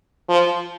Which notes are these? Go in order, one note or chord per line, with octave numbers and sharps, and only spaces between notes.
F3